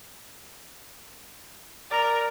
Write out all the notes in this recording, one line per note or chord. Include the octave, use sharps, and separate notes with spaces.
A#4 D5 A#5